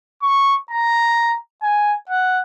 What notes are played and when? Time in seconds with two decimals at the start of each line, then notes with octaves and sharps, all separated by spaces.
0.23 C#6
0.71 A#5
1.63 G#5
2.09 F#5